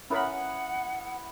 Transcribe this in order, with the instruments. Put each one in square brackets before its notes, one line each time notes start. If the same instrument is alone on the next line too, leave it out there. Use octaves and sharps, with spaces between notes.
[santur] B3 E4 [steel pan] C#4 A#4 B5 [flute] F#5